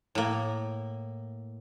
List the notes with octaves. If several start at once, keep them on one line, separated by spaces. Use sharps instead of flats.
A2 A#3